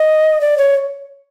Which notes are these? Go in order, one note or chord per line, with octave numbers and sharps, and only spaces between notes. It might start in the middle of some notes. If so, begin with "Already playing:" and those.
Already playing: D#5
D5
C#5